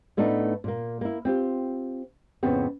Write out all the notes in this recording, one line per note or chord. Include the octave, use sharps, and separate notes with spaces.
A2 A3 B3 D4 D#4
A#2 A#3
A#3 E4
C4 F4 G4
F2 A2 C#3 B3 C4